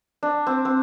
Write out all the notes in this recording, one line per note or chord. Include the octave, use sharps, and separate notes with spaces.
D4
C4
C4